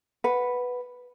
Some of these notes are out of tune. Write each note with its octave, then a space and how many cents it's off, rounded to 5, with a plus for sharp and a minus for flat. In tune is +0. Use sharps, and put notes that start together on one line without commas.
B4 +0 F#5 -5